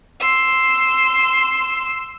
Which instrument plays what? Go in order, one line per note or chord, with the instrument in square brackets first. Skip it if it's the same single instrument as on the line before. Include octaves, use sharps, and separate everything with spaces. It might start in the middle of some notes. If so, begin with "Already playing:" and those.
[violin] C6 E6